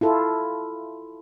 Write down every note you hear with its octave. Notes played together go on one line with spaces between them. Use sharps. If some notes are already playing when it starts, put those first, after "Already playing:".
E4 F4 A4